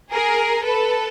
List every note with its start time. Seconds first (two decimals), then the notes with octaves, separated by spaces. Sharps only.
0.11 G#4 A#4
0.63 A4 B4